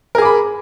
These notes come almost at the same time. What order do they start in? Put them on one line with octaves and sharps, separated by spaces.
A#4 G#4 D6 B5